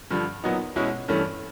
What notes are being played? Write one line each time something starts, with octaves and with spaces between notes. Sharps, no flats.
G2 D3 F3
A#2 F#3 B3 D#4
B2 G#3 C#4 E4
G2 E3 A3 C#4